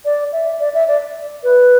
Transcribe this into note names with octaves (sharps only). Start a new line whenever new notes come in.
D5
E5
D5
E5
D5
B4